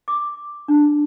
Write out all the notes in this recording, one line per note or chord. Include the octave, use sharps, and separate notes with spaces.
D6
D4